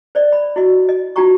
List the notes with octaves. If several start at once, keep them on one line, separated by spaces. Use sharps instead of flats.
C5 D5 D#5
B5
E4 F#4 D#5
D#5
D#4 F4 F#4 G5 A#5 C#6